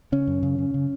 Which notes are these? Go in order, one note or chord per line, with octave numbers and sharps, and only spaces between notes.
C#3 C#4
F#2
C#3
C#3
C#3